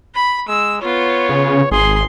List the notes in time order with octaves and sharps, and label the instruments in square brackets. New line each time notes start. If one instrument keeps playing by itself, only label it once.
[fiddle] B5
[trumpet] G#3 [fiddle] E6
[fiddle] B3 F4 [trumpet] C#5
[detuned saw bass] C#3
[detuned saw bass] G#1 [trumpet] G#4 [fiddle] C6